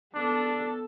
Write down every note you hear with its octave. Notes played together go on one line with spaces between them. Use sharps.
B3 D4 A4